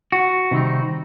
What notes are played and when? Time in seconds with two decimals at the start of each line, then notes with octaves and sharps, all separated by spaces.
0.12 F#4
0.51 C3 D#3 G3 C4 D#4